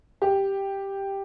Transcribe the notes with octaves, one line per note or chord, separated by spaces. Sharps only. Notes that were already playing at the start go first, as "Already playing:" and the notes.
G4